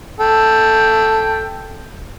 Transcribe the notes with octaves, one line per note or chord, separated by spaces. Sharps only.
A4 G5